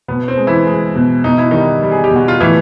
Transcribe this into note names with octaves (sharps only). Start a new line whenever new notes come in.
B2 B3
C4
G#3
E3 E4
G#3
B2
B2 D#4
E4
D#3 G3 D#4
G3
G#4
G4
B2 F#4
F4
A2 E3 E4